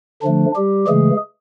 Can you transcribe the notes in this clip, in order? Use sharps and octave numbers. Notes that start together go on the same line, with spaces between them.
D3 F3 A3 D4
G3 G4
C#3 E3 G#3 A3 G#4